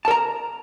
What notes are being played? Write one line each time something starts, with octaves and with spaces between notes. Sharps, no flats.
A#4 A5 A#5